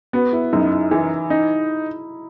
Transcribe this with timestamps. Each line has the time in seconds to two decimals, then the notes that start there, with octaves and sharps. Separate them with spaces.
0.13 B3 F#4
0.33 E4
0.53 F#2 D#4
0.71 E4
0.91 E3 E4
1.30 D#4